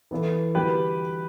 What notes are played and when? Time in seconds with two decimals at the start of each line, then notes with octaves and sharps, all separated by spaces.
0.11 E3 B3 E4 A4
0.55 D3 G3 B3 F#4 G4 B4